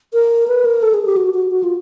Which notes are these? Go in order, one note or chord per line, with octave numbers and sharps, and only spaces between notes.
A#4
B4
A#4
A4
G#4
G4
F#4
F#4
F#4
F4